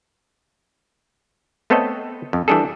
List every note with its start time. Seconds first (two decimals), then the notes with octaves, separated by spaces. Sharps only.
1.70 A3 B3 C4 A4 C#5 D#5
2.33 F2
2.48 E3 G3 D4 G#4 A4